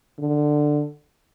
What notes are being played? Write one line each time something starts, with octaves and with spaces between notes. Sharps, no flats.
D3